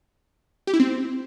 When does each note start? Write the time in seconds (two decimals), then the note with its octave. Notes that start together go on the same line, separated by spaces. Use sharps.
0.67 G4
0.74 E4
0.80 C4